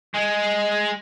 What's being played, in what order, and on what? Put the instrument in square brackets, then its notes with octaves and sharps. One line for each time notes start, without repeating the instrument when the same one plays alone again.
[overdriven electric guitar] G#3